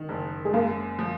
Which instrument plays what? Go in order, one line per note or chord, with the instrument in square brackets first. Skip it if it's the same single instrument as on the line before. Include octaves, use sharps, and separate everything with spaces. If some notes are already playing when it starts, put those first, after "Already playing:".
Already playing: [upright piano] D#3
F#1
[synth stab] G#3
[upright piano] F#2 [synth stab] A#3
[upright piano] F3